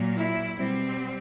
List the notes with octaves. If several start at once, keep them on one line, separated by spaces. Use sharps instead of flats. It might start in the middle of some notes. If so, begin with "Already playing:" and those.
Already playing: A#2 F#3 A#3
E4
B2 G3 C4